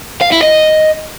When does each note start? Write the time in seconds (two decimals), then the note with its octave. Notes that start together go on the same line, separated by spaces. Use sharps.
0.21 F5
0.32 E4
0.43 D#5